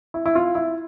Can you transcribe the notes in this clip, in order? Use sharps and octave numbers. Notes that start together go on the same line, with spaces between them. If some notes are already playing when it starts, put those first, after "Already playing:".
E4
E4
F4
E4